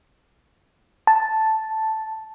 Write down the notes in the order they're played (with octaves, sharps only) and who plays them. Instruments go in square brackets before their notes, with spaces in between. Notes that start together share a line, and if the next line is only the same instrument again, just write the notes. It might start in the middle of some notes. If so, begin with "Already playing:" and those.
[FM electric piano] A5